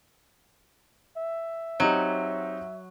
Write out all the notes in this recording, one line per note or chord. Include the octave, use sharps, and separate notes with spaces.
E5
F#3 C4 D#4 G4